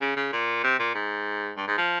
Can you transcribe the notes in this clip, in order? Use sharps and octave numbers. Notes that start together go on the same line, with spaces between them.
C#3
C#3
A#2
C3
A#2
G#2
G2
G#2
F3